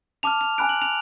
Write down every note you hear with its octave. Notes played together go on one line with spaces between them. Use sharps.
A5 D6 F6 F7
F7
G#5 B5 F#6 D7
F#7
F7